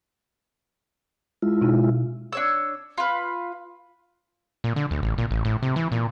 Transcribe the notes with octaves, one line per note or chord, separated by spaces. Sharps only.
G#3 E4 F4
B2 D#4
D4 C#5 E6
F4 B4
A#2
D3
D2
A1
A#2
A1
A2
C3
E3
A#2